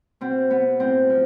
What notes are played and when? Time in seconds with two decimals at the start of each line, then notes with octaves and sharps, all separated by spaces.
0.21 B2 C4
0.51 B3
0.80 A2 C4
1.10 F3